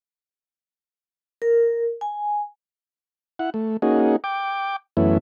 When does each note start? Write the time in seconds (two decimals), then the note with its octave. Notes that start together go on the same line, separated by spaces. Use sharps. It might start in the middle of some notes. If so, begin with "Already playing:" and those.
1.42 A#4
2.01 G#5
3.39 E4 F#5
3.54 A3
3.82 A#3 C#4 D#4 F#4 G#4
4.24 G5 D6
4.97 F#2 E3 A3 B3 C#4 E4